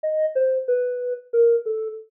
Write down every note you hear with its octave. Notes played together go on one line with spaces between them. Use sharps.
D#5
C5
B4
A#4
A4